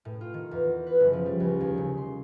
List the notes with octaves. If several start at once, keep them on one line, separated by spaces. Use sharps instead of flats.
A2
F4
D#3
E2
B4
F#1
F3
G3
C#2
D#2
C#3
C6